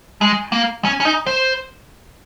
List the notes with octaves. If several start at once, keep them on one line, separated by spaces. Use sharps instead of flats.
G#3
A#3
C#4
C#4
D#4
C5